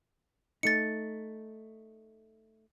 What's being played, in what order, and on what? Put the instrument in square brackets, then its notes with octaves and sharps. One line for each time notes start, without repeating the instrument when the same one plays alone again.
[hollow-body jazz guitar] A3 D#4 [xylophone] A6 C#7